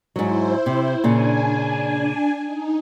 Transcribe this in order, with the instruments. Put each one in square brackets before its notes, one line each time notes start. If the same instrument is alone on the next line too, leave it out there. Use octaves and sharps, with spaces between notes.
[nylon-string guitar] G#2 F#3 [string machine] E4 C5
[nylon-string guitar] C3
[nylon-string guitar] A#2 C#3 [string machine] D4 G#5
[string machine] D#4